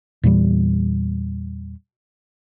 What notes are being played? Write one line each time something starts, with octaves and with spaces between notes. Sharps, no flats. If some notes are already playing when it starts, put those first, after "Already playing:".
E2 A#2 E3 G3